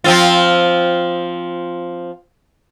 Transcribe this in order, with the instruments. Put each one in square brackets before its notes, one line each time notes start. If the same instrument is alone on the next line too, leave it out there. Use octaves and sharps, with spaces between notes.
[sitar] F3 C4 F4